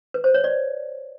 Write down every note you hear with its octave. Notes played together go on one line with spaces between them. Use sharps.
B4
C5
C#5
D5